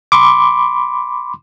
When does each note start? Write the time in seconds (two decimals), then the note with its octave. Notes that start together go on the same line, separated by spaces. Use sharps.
0.12 B5 C6 D6